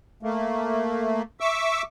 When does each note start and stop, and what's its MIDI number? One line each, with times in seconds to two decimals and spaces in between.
0.23 1.22 57
0.23 1.22 58
1.40 1.82 76
1.40 1.82 85
1.40 1.82 86
1.40 1.82 88